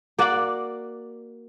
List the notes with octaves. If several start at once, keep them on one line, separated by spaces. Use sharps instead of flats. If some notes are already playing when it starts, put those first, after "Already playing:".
A#3 F#4 D5 F#5